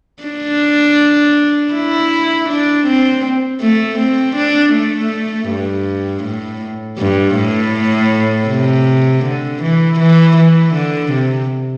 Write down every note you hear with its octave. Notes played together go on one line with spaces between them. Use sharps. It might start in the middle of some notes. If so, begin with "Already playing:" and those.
D4
E4
D4
C4
A3
C4
D4
A3
G2
A2
G2
A2
C3
D3
E3
E3
E3
D3
C3